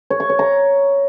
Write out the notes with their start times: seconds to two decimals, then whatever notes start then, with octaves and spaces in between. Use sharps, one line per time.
0.10 C#5
0.20 C#6
0.30 C#5
0.39 A#5